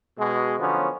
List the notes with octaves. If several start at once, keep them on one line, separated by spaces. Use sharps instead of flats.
B2 G#3
D3 F3 F#3 B3 C#4